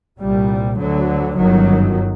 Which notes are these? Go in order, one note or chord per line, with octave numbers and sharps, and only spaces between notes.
C2 A#2 G3
D2 D3 F#3
G1 F#2 D#3 F#3